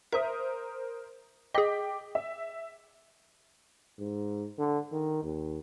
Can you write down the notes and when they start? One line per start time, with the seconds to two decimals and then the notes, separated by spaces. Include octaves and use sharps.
0.12 A#4 C5 E5 D#6
1.54 G#4 D#5 G5 D6 B6
2.15 E5
3.99 G#2
4.58 D3
4.92 D#3
5.24 D#2